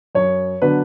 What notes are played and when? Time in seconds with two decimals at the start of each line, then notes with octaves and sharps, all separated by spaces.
0.15 F#2 C#5
0.62 D3 F#3 B3 D4 B4